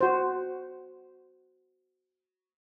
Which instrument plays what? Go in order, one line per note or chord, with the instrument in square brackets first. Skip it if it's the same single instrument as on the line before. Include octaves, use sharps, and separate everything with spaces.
[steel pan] F#4 C5